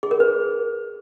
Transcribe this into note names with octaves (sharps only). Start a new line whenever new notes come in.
G#4
A#4
B4